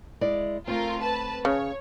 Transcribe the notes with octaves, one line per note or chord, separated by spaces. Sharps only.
G#3 E4 D5
A3 C4 F4 A#4
B4 A5
C#3 C#5